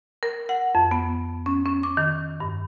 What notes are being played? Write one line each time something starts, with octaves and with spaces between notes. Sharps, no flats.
A#4
F#5
F2
B3
C#4
C#4
D6
D#3
G2